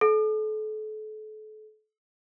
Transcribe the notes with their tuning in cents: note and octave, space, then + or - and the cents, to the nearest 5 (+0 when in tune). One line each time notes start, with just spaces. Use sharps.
A4 -35